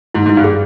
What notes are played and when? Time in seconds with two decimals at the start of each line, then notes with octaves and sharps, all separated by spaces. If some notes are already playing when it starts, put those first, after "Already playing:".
0.14 G#2 E4
0.26 G#2
0.29 E4
0.37 G2
0.44 G#4